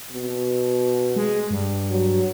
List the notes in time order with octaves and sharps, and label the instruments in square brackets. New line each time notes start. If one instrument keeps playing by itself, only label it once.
[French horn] B2
[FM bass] G#3
G2
[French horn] F#3